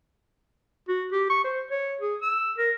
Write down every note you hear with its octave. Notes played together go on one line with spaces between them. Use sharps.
F#4
G4
C#6
C5
C#5
G#4
E6
A#4